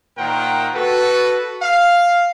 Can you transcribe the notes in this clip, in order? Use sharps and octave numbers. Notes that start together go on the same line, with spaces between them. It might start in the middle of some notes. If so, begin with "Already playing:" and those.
A#2 D#3 A#4 C5 F#5 G5
F#4 A4 B4
F5